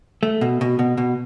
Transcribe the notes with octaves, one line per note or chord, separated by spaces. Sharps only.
A3
B2
B2
B2
B2